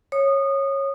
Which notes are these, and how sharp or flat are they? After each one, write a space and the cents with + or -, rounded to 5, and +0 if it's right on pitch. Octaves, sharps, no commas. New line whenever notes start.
C#5 -15 D#6 -25